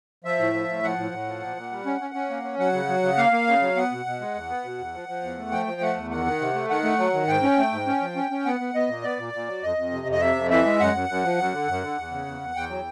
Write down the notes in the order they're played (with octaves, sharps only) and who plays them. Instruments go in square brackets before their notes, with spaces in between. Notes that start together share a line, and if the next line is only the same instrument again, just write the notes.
[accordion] F3 E5
A2
F3
A2
F3 F#5
A2
A2
F3
A#2
A#2
G3
C#4
C#4
C#4
A#3
C#4
F#3 F#5
C#3
F#3
C#3
A#3 F5
A#3
C#3
F#3
B3 F#5
B2
B2
G#3
E2
B3
B2
E2
F3
F3
E2
A3
F3 G5
F3
A3 F#5
E2
D#3 F#5
D#3
C3
A3
D#3 F#5
A3
F#3
D#3
G#2 G5
C#4
A3
G#2
C#4
F3
C#4
C#4
B3 F#5
B3
B3 D#5
A#2
B3 D5
A#2
A#2
F#3
F2 D#5
F2
C3
F2 D#5
C3 E5
F2
E3 E5
G#3
F#2 F#5
F#2
F#2
F3
F#2
D3
F#2
D3
E2
C#3
E2
E2
E2 G5
F#3